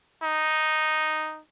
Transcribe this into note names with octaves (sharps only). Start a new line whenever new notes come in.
D#4